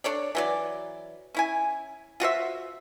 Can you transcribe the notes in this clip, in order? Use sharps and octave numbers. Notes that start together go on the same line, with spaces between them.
D4 A4 C#5 D5
E3 F#3 D5
C#4 E4 G#5
F4 F#4 C5 E5